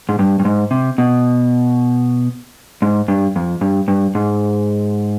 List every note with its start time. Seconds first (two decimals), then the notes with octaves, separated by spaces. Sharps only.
0.09 G#2
0.19 G2
0.39 G2
0.45 G#2
0.71 C3
0.98 B2
2.82 G#2
3.08 G2
3.36 F2
3.61 G2
3.88 G2
4.15 G#2